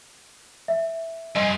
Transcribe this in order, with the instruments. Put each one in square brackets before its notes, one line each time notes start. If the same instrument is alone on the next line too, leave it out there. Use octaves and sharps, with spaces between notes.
[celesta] E5
[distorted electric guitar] G2 [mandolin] D#5 G#5 C6